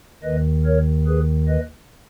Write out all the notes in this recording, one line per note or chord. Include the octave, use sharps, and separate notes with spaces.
D#2 D#3 B4 D#5
A#4 C#5
G#4 B4
B4 D#5